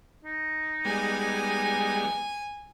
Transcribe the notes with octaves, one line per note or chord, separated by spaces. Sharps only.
D#4
G3 G#3 B3 G#5